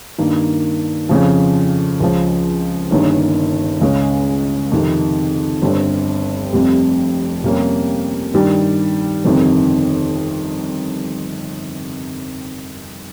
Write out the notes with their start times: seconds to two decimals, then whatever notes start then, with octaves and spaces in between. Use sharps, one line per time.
0.18 G2 D#3 A#3
1.09 F2 C#3 F3
2.00 C#2 C#3 F3
2.91 G1 G2 D#3 A#3 C#4
3.81 C#2 C#3 G#3 C#4
4.71 F2 C3 D#3
5.62 G1 G2 G3 C4
6.53 F1 F2 C3 G3
7.44 F2 C3 G3 A#3 C#4
8.34 G2 D#3 G3
9.25 G1 F2 C3 D#3